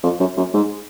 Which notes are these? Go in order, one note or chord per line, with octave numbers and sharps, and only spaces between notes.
F2
F#2
F#2
G#2